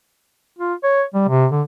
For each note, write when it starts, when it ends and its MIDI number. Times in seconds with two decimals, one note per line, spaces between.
0.58 0.74 65
0.83 1.03 73
1.14 1.24 55
1.28 1.46 48
1.51 1.62 50